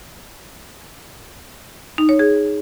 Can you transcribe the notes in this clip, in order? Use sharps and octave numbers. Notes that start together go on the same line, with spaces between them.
D#4
C#5
G#4